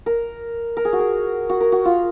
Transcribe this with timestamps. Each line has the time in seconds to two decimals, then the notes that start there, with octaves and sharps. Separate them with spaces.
0.06 A#4
0.77 A#4
0.85 G#4
0.93 F#4
0.99 G#4
1.50 F#4
1.61 A#4
1.72 F#4
1.85 F4